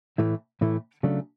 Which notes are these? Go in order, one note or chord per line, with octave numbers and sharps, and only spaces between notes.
A2 E3 A3 E4
A2 E3 A3 E4
C#3 F#3 A3 D4